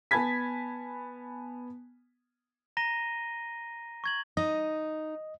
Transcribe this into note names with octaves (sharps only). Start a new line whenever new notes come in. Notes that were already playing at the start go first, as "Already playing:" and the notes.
B3 G#5 A5 B5 G#6 B6
A#5 A#6 D#7 G7
C#6 G#6 F#7
D#4 D#5